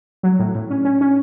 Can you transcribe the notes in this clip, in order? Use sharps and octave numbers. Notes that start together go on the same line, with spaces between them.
F#3
A2
A2
C#4
C#4
C#4